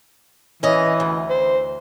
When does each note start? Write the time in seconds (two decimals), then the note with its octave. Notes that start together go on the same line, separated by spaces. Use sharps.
0.63 E3 C#4 D#5
1.00 D2
1.29 C5